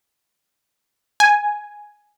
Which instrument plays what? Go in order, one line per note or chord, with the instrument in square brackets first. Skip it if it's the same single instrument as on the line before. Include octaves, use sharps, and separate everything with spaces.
[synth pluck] G#5